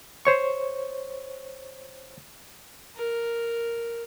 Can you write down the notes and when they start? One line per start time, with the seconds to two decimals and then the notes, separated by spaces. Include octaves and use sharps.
0.25 C5 C#5 C#6
2.96 A#4